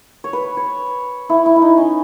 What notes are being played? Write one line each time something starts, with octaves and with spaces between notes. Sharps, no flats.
C#5
B4
C#5
E4
E4
E4
D#4
C#4